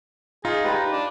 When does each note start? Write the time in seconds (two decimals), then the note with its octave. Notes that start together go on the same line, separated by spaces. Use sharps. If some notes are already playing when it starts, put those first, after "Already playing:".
0.45 D#4 F4 G#4
0.64 G4 B4 D5 B5
0.92 D4